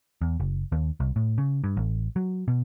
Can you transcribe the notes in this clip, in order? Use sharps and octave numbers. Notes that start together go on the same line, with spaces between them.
E2
F#1
D#2
C2
A2
C#3
G2
A1
F#3
B2